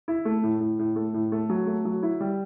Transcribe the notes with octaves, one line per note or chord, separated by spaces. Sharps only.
E4
A3
A2
A2
A2
A3
A2
A3
F#3
A3
F#3
E4
G3